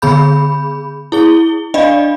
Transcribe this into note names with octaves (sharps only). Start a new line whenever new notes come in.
D3 B3 G#4 B5 G6
E4 G#4 G7
D4 D5 D#5 F5 B5